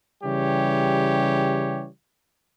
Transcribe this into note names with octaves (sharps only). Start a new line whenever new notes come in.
C#3 E3 G3 G4 C#5